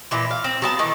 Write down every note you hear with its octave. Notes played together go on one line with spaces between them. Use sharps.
A#2 E3 B4
F5
C4
F#3 B3 A5
D#3 E3 A3